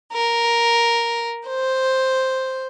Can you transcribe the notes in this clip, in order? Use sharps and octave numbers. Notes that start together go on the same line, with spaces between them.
A#4
C5